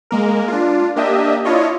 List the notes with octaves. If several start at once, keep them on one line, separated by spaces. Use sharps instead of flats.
G#3 A#3 A#4
D4 F4
A#3 D4 G4 D#5 E5
D4 E4 F4 C#5 D#5